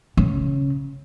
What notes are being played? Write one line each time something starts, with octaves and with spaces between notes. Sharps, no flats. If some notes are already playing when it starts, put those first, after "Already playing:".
C#3